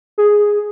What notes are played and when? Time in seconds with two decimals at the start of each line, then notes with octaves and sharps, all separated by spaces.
0.18 G#4